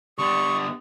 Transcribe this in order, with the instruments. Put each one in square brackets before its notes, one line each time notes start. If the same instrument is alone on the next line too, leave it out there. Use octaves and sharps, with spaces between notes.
[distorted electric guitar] D3 B3 [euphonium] G3 [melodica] C#6 [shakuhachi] D#6